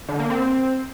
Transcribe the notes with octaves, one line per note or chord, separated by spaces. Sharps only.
D3
A#3
C4